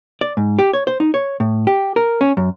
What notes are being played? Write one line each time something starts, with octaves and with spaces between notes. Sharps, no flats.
D5
G#2
G4
C#5
C5
D#4
C#5
A2
G4
A#4
C#4
F#2